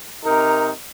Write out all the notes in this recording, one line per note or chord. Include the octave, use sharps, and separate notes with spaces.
C3 D#4 A#4